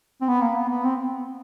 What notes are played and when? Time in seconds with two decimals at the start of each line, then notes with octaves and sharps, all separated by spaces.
0.21 C4
0.28 B3
0.42 A#3
0.56 B3
0.69 B3
0.84 C4